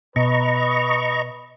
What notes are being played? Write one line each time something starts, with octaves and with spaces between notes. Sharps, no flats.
B2 B4 D#5 A#5 C#6